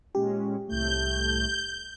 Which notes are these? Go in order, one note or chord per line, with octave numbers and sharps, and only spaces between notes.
A#2 G#3 C#4 G4
C2 A2 A3 G6